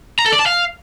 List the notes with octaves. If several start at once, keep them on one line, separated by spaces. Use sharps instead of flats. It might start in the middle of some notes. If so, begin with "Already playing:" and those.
A#5
A4
D5
A5
F5